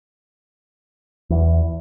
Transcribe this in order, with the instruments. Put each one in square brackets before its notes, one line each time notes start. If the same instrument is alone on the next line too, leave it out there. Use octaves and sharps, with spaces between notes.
[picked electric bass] E2